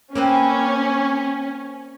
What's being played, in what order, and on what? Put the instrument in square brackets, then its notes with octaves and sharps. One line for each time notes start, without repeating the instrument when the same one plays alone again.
[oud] A#3 C4 B4 [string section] C#4